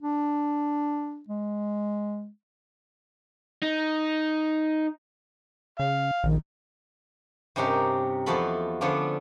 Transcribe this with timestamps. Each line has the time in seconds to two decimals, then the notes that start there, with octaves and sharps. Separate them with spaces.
0.02 D4
1.29 G#3
3.62 D#4
5.79 C#3 F5
6.24 A#1 D#3
7.56 G2 C3 C#4 D#4 G4 A#4
8.26 E2 F3 F4 F#4 A4 B5
8.81 D3 F3 B3 C#4 D4 F4